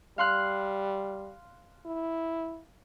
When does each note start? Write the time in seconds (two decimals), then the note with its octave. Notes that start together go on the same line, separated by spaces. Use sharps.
0.18 G3 F5 C6 F#6
1.86 E4